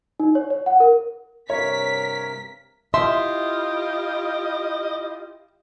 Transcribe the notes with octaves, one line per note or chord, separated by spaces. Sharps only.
D#4
C#5
C#5
F#5
A#4
G2 C3 A#4 C#5 B6
E4 F4 G4 D#5 E5 C6